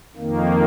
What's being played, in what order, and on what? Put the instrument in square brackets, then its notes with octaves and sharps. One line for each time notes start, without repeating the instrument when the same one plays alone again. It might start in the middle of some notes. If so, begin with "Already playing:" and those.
[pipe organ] F2 D#3 A#3